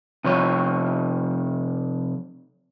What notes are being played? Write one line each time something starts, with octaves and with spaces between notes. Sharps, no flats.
C3 F3 C#5